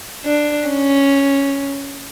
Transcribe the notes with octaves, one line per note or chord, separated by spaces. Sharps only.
D4
C#4